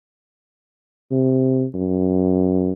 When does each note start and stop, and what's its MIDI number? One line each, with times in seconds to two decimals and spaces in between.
1.11 1.65 48
1.74 2.72 42